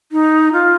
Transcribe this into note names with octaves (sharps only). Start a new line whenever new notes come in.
D#4
F4